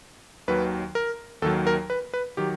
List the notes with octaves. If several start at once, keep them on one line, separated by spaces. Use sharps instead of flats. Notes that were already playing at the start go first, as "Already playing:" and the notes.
D#2 D#3 F#3 B4
A#4
D#2 D#3 F#3 A4
A#4
B4
B4
D#3 F#3 G4